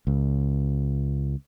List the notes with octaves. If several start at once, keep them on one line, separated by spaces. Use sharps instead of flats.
C#2